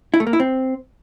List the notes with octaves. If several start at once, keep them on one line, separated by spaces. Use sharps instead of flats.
E4
A3
A#3
E4
C4